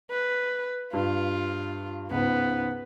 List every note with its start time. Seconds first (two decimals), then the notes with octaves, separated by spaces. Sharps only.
0.11 B4
0.93 G2 F4
2.11 C#2 G#2 B3